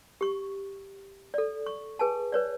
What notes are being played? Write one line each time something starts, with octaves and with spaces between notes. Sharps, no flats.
G4 C#6
A4 D5
C#6
G#4 B4 G#5 A5
B4 C#5 D5